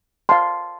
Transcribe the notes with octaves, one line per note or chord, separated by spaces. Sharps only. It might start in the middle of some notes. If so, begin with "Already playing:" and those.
F5 A5 C6